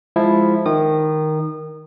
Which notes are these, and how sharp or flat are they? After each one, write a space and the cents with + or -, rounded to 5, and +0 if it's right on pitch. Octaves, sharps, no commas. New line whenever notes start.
F3 +0 G#3 +0 E4 +0
D#3 +0 D#6 -30